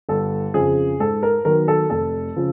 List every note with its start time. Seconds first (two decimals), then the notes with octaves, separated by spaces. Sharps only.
0.09 G1 A4
0.54 F2 C#3 G#4
1.00 G#2 A4
1.23 A#4
1.45 D#3 F#3 B3 A#4
1.68 A4
1.90 F1 A4
2.36 C#3 F3